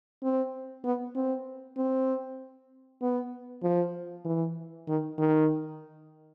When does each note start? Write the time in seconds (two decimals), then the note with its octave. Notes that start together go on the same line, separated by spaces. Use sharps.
0.23 C4
0.84 B3
1.15 C4
1.77 C4
3.02 B3
3.63 F3
4.25 E3
4.88 D#3
5.18 D#3